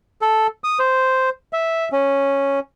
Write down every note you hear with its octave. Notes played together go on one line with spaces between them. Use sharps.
A4
D#6
C5
E5
C#4